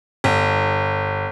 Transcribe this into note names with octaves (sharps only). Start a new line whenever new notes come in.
G1